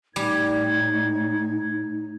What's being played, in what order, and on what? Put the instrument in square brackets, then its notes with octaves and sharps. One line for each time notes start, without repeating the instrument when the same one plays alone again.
[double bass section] A2 [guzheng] G3 [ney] D#4 [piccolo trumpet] G#6